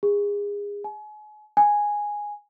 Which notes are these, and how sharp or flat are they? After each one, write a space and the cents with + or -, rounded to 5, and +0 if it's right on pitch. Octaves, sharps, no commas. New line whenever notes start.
G#4 -30
G#5 +35
G#5 -5